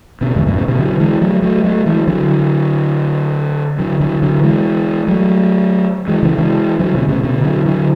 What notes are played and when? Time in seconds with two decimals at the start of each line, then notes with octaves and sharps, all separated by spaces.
0.21 B2 D3
0.35 E2 G#2
0.46 F#2 A2
0.57 A2 C#3
0.68 B2 D3
0.79 D3 F#3
1.00 E3 G#3
1.21 F#3 A3
1.42 F#3 A3
1.64 F#3 A3
1.86 E3 G#3
2.07 D3 F#3
3.79 D3 F#3
4.00 D3 F#3
4.22 D3 F#3
4.43 E3 G#3
5.08 F#3 A3
6.08 E3 G#3
6.23 C#3 E3
6.37 E3 G#3
6.79 D3 F#3
6.95 B2 D3
7.08 A2 C#3
7.23 B2 D3
7.44 D3 F#3
7.66 D3 F#3